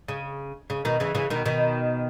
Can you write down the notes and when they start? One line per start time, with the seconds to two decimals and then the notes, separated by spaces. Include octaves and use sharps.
0.08 C#3
0.70 C#3
0.85 B2 D#3
1.00 C#3 E3
1.15 C#3 E3
1.30 B2 D#3
1.45 B2 D#3